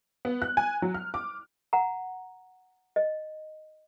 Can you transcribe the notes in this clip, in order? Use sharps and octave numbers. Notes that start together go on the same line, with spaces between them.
B3
F#6
G#5
F#3
F6
D6
F#5 A#5
D#5